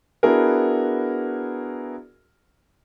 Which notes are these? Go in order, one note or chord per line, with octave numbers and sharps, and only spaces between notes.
B3 D4 E4 F#4 G#4 A#4